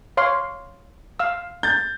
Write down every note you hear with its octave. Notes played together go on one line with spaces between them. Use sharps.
C#5 F5 C6
F5 E6
G6 A6